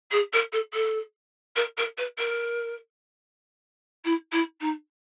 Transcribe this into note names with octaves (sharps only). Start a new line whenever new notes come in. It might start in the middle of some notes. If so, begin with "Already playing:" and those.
G#4
A#4
A4
A4
A#4
A#4
B4
A#4
E4
E4
D#4